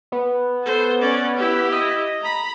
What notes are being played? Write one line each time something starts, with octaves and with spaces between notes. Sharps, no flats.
B3
A4 C5
C#4 D5
E4 G4
D#5
A#5 B5